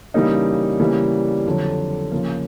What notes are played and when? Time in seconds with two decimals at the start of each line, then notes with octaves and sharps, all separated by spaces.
0.14 C#3 E3 G3 A#3 D#4
0.80 C#3 E3 G3 A#3
1.46 F2 D3 F#3
2.12 C#3 F3 A#3